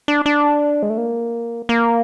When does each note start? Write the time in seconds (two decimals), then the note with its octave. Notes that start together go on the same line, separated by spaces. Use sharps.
0.08 D4
0.26 D4
0.83 G#3
0.90 A3
0.98 A#3
1.69 A#3